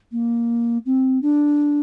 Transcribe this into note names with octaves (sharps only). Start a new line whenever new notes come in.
A#3
C4
D4